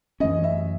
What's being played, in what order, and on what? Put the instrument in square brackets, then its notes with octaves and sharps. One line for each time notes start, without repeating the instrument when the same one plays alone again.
[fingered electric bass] F#2 E3 A3 C#4 [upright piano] D#5
[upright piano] E5